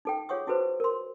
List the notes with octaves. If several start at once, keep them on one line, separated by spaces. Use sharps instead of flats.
D#4 A4 G5
F4 G#4 C#5 F#5 C#6 D#6
E4 F#4 A4 B4 C5
A#4 C6